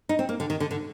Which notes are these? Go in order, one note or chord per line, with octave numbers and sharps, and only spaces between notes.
D#4
C4
A#3
D3
D#3
D3
D3